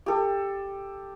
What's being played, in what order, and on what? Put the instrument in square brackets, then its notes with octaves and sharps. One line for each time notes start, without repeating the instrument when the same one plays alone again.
[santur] G4 A4